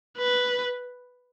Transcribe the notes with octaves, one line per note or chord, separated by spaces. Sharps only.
B4